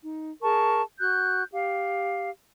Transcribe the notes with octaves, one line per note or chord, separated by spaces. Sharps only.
D#4
G#4 A#4 A5 C#6
F#4 F#6 G6
G4 F5